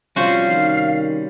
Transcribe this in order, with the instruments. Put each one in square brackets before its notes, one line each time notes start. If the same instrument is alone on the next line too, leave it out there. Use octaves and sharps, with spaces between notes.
[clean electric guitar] C3 G3 C#4 [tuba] F3 [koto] F#4 C5 [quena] F5
[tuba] D#3